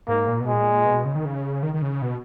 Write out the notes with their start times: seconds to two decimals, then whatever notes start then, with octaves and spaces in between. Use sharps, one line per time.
0.08 G#2 A#3
0.28 A#2
0.40 B2
0.47 G#3
0.52 A#2
0.86 B2
1.05 C#3
1.15 D#3
1.25 C#3
1.63 D#3
1.74 D#3
1.82 C#3
2.02 B2